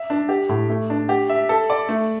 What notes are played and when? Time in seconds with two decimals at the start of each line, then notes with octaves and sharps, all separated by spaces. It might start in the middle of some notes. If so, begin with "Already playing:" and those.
Already playing: E5
0.10 D4
0.29 G4
0.49 A2
0.70 A3
0.90 D4
1.09 G4
1.30 E5
1.49 A4
1.70 D5
1.89 A3